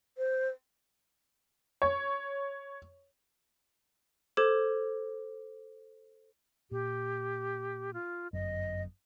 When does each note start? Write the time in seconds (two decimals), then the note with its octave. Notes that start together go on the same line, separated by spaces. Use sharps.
0.18 C5
1.82 C#5
4.37 A4 C5 D6 G#6 E7
6.71 A#2 G4
7.94 F4
8.33 G1 F#2 D#5